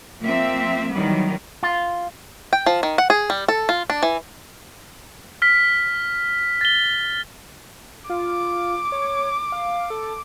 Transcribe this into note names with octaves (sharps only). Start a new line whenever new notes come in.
F3 A#3 C4 E5
D#3 E3 F#3 G3 B3
F4
G5
F3
D#3
F#5
G#4
G3
A4
F4
D4
E3
F6 B6
A6 G7
F4 D6
C#5
F5
A4